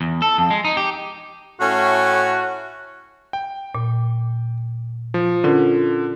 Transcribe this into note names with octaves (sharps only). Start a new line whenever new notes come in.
E2
A4
F2
G#3
D#4
G4
A2 C#4 F#4
G5
A#2
F3
D3 C#4 F4 A#4